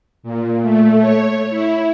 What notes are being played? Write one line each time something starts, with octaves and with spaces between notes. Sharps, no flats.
A#2
A3
C#5
E4